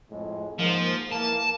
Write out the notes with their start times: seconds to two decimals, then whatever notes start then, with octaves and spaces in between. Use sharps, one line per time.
0.10 F2 A2 G#3
0.59 G#2 F3 A#3
1.12 E3 A#3 A5